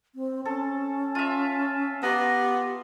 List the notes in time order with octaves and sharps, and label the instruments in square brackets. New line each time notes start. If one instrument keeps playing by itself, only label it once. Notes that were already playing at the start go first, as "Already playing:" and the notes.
[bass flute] C4
[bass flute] C#4 [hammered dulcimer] A4
[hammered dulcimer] F4 E5
[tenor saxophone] B3 [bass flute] G4 [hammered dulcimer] A#5 C6